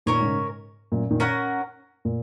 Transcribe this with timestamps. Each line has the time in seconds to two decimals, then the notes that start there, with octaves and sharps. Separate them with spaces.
0.06 A#2 D#3 C#4 A#4 C#5
0.20 G#2 C#3
0.92 F#2 A#2
1.11 A#2 D#3
1.20 C#4 A#4 F#5
2.05 A#2